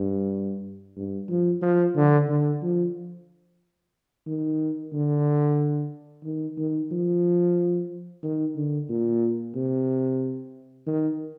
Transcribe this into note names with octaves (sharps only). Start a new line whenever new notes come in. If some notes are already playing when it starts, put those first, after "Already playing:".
Already playing: G2
G2
F3
F3
D3
D3
F3
D#3
D3
D#3
D#3
F3
D#3
D3
A#2
C3
D#3